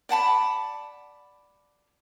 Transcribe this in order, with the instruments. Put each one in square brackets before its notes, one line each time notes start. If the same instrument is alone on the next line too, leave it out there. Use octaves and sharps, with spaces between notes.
[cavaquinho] D5 F#5 A5 B5